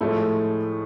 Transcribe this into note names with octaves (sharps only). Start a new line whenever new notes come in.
A2 F3 G#3 A3